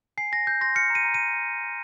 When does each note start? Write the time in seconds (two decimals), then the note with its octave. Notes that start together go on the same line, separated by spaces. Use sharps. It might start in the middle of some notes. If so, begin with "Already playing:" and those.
0.18 G#5 C7
0.32 G#5 A#6
0.47 G6
0.61 C6 A#6
0.75 F6 C#7
0.90 A#5
0.95 D#7
1.04 A#5
1.14 D#7